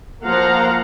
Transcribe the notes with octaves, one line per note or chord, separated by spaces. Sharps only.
F3 A#3 F5 F#5 A#5